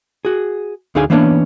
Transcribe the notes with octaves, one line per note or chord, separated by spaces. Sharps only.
F#4 G#4
D2 D3 D#4 G#4 F5 G#5
E3 A#3 B3 C#4 D4 C#5